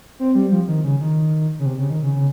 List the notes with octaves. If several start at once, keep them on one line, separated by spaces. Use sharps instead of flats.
C4
G3
F3
D#3
C#3
D#3
C#3
C3
C#3
D#3
C#3
C#3